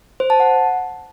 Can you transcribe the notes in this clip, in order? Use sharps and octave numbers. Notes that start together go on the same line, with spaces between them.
C5
A5
F#5